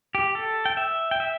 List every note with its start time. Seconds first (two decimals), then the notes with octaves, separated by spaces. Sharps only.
0.15 G4
0.35 A4
0.65 G5
0.77 E5
1.11 G5
1.20 E5